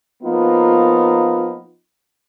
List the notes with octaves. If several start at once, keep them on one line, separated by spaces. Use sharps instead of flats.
F3 A#3 B3 D#4 F4